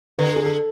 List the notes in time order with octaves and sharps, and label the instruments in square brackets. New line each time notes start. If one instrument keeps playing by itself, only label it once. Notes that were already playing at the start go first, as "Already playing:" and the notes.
[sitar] D3 [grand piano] B4
[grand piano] A4
G#4
A4